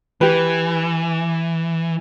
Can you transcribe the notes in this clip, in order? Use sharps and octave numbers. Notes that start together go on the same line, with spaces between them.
E3 G4 B4